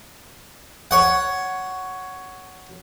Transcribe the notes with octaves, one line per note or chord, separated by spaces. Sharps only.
C#5 F#5